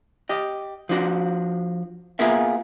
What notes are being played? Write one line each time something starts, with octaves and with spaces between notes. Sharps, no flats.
G4 D#5
F3 D4 F#4
A#3 B3 F4 G#4 A#4 E5